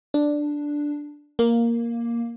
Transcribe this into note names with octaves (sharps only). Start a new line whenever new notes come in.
D4
A#3